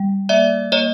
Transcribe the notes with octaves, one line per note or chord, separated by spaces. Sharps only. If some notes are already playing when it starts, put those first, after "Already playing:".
Already playing: G3
A#3 D5 E5
A#3 C#5 D#5